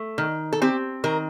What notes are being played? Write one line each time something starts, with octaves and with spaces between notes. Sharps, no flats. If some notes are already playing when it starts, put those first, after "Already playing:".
Already playing: A3
D#3
A4
C4 G4
D#3 A#4